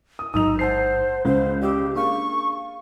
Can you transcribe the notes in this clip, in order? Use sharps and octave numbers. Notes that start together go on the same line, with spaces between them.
D#6
A1 G#2 F#3 D#4 D#6 E6 F7
C5 F#5 A5 C7
C#2 G#3 C5
G4 D5 D#6 E6
A#3 D4 G#4 F5 C#6